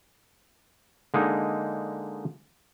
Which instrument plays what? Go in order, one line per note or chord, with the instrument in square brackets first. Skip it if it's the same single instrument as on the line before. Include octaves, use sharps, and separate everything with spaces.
[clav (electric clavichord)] D3 G#3 A#3 D#4